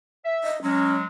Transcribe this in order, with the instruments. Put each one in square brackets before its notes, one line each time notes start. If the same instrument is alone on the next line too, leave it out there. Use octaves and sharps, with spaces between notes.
[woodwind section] E5
[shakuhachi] D#5
[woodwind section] F#3 G#3 [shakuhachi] C#4